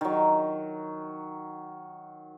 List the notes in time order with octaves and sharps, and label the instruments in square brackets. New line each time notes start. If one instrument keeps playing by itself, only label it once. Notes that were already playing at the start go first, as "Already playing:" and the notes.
[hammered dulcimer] D#3 F#3